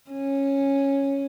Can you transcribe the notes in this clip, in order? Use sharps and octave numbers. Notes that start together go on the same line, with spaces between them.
C#4